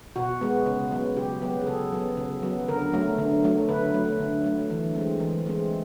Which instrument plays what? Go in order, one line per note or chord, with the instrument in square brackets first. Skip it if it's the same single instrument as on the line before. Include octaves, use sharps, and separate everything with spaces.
[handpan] B2 F#4
G#3 B3
C#3
F#3 B3
C#3 G4
F#3 B3
G#4
C#3 A4
F#3 B3
C#3
F#3 B3
D3 A#4
F#3 A3
D3
F#3 A3
D3 B4
F#3 A3
D3
F#3 A3
E3
G#3 C4
E3
G#3 C4